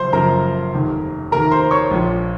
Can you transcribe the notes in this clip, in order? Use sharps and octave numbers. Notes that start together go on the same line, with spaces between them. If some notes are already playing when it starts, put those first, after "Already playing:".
Already playing: F#1 F#2 F3 C5 C6
F#1 F#2 F3 A#4 A#5
F1 D#2 D#3
F1 D#2 D#3 A#4 A#5
C5 C6
C#5 C#6
A#1 A#2 F3